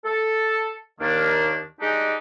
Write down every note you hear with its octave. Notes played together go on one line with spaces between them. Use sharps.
A4
D#2 D#3 A#3 D4
G#3 D4 D#4 G4